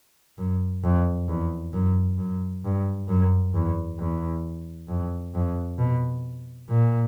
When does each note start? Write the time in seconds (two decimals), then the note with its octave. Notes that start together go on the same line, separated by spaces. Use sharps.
0.38 F#2
0.83 F2
1.29 E2
1.73 F#2
2.18 F#2
2.64 G2
3.09 F#2
3.54 E2
3.99 E2
4.88 F2
5.35 F2
5.79 B2
6.69 A#2